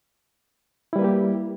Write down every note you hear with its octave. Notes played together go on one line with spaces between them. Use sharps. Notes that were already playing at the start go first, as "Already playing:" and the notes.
G3 A#3 E4 G4 B4